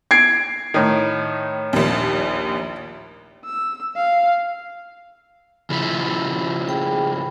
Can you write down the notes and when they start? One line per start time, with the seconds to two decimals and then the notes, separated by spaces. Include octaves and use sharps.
0.11 G#6 C7 D7
0.74 A2 D#3
1.73 A#1 D#2
3.45 E6
3.96 F5
5.70 C#3 F3 E4 B5 E6
6.68 G#4 G5 B5